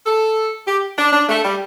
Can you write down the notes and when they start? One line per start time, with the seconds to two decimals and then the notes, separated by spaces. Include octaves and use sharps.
0.06 A4
0.67 G4
0.98 D4
1.13 D4
1.29 A3
1.44 G3